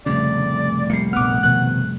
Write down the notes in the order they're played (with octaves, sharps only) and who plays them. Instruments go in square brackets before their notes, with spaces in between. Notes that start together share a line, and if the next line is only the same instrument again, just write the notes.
[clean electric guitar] C2 F2 A2 [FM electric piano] C#3 [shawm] D5
[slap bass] G3 A#3 [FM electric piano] C7 C#7
[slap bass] A#1 B3 [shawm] F#5 [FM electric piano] D6 F6
[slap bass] B2 D#3 F3 [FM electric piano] F#6